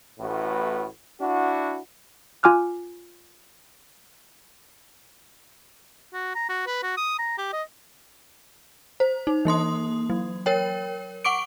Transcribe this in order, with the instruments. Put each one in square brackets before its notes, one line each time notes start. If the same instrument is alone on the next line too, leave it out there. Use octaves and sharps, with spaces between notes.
[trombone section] A1 A2 F#4 B4
D4 E4 F#4
[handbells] F4 G#5 D6 F6 F#6
[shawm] F#4
A#5
F#4
B4
F#4
D#6
A#5
G4
D#5
[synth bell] C5
D#4
E3 A#3 C6 D#6
F#3
A#4 C#5 G5
F#5 C#6 D6 D7